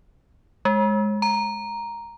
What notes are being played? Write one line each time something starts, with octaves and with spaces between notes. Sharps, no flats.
G#3
A#5